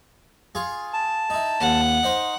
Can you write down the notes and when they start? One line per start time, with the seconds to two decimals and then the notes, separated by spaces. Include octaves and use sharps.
0.55 F4 G#4 C#6
0.94 A5
1.30 D#4 E4
1.61 D#2 F#5
2.03 D#4 C5 C#6